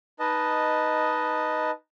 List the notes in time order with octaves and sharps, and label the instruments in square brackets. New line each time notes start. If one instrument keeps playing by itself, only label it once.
[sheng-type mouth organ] D#4 B4 D#5 A5